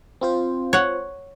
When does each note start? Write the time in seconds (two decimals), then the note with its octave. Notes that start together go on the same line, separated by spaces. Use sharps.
0.21 C4 F4 C5
0.73 C#5 F#5